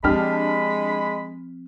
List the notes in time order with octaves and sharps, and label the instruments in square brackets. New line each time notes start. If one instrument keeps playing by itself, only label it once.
[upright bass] F3 C4 [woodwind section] G#3 B5 [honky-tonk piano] D4 G4 F6